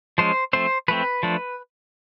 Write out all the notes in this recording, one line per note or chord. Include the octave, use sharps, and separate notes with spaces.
F3 G#3 C#4 C5
F3 A3 C4 C5
F3 A3 C4 B4
F3 A3 D4